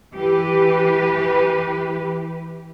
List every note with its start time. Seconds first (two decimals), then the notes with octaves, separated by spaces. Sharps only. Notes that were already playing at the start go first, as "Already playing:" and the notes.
0.17 E3 G4 B4